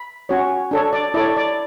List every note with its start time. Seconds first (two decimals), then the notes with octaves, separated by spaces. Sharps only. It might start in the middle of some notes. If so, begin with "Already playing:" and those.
Already playing: B5
0.29 C#4 F#4 C#5
0.71 D4 A4 C#5
0.93 D5
1.14 E4 A4 C#5 D5
1.37 D5